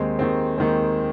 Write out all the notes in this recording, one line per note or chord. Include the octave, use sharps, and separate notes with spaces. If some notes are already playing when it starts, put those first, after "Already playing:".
Already playing: D#2 D#3 G#3 C4
D#2 D#3 G#3 C4
D#2 D#3 G#3 C4